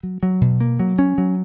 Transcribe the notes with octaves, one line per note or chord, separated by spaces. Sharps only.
F#3
F#3
B2
A#3
F#3
C#4
F#3